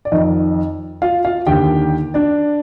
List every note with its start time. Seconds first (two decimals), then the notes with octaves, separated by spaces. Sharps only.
0.05 D5
0.12 F2 D#3 D#4 D#5
1.02 F4 F5
1.25 F4 F5
1.47 D#2 D3 G4 G5
2.14 D4 D5